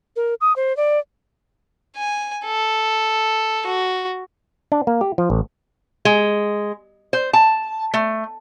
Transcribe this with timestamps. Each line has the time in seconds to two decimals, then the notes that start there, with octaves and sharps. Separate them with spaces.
0.16 A#4
0.41 D#6
0.56 C5
0.77 D5
1.96 G#5
2.45 A4
3.66 F#4
4.72 D4
4.87 A#3
5.01 G4
5.18 F3
5.30 A1
6.05 G#3
7.13 C5
7.33 A5
7.94 A3